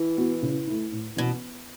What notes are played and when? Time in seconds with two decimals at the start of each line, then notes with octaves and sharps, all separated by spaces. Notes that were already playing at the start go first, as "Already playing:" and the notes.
Already playing: E3
0.18 B3 F#4
0.42 C#3
0.68 A3 E4
0.92 A2
1.16 B2 E3 C#4 F#4